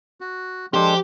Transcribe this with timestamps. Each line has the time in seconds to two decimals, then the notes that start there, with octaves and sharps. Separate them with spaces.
0.21 F#4
0.74 F3 G#3 D4 G4 A4 C5